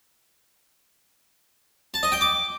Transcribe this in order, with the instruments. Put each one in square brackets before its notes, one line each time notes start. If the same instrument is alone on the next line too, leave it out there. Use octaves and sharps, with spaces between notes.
[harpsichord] A5
D#5
G5
D6